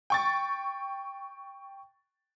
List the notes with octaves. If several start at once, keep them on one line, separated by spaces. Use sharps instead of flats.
G5 C#6 A6